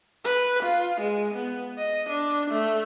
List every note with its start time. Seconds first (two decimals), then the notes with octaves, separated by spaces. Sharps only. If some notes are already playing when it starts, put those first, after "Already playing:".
0.25 B4
0.63 F4
1.01 G#3
1.35 B3
1.79 D#5
2.10 D4
2.51 A3